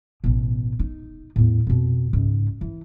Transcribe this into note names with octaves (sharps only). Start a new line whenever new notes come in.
A1 B2
D#4
E2 A2
F2 B2
C#2 G#2
E3